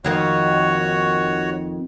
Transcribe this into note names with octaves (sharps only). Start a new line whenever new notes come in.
F2 D#3 A#3 F#4 C#5